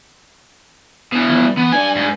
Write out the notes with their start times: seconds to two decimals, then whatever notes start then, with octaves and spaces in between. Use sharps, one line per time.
1.13 B2 E3
1.29 D#3 F3 B3
1.44 G3
1.57 E3 B3
1.72 D4 B4 D5 G#5
1.96 G#2